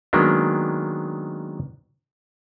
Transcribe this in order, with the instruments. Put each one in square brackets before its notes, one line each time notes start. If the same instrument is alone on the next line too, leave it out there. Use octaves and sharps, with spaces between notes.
[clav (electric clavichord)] D#3 F#3 G#3 A#3 B3 D4